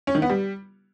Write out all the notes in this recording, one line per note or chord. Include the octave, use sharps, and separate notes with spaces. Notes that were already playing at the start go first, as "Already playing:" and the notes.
C#4
D#3
B3
G3